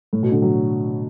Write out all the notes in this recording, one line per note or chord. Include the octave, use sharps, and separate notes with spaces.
A2
B2
D3
F#3